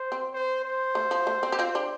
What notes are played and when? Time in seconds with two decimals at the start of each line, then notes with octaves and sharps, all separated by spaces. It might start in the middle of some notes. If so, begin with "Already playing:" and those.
Already playing: C5
0.12 C4
0.33 C5
0.64 C5
0.95 A3
1.11 F3
1.27 A3
1.43 C4
1.52 G4
1.59 C4 F4
1.75 D4 G4